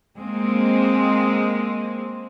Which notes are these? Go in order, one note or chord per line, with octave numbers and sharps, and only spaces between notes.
G#3 A#3 C4